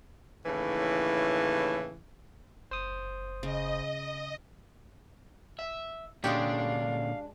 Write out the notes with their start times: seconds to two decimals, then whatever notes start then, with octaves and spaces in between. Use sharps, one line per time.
0.44 D#2 A2 C#3 E3
2.71 F#1 C5 D#6
3.43 C#3 D#5
5.59 E5
6.24 A#2 D3 G#3 C#4 D4 F#4 G4 F5